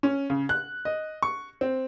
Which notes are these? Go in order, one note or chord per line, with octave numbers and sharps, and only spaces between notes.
C#4
C#3
F#6
D#5
C#6
C4